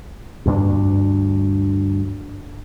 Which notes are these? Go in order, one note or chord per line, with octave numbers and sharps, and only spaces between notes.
D2 G2 C4 D4